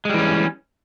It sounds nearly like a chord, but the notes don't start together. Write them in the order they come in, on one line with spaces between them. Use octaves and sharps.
G#3 G3 E3 C#4